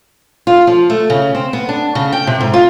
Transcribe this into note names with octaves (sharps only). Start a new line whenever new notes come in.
F4
F3
A3
C#3
C4
B3
D4
C#3
G5
C3
G#2
F4